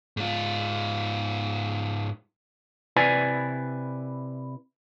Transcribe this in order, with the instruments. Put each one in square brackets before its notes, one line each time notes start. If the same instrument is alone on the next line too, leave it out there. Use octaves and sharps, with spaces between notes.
[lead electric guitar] G#2 F4
[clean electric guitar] C3 E4 B4 D5 G#5